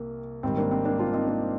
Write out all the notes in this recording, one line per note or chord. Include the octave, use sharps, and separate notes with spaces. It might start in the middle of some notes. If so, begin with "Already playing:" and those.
Already playing: C2 C3 A#3
G#1 G#2 D#3 G3 C4
A#3 D4
C4
A#3 D4
D4 F4
C4 D#4
A#3 D4